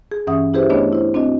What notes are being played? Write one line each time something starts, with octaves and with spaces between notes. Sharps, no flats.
G#4
G2 E3 C#4 E5 F#5 D#6
E4 G4 G#4 B4 C5 E5
A3 B3 D4 C#5 D#5
E4 C5
C4 D4 F#4 D#5